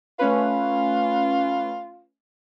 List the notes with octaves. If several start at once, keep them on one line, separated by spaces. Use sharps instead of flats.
A3 C#4 F4 B4